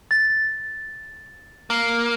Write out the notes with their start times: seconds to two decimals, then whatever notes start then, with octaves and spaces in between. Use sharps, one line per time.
0.11 A6
1.70 A#3